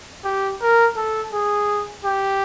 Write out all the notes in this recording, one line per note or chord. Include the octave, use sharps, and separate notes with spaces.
G4
A#4
A4
G#4
G4